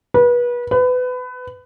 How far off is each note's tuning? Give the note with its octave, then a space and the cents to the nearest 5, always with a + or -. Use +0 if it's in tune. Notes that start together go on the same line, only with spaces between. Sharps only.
B4 -30
B4 +25